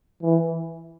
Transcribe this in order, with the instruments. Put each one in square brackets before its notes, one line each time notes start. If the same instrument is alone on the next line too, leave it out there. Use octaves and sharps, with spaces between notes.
[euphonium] E3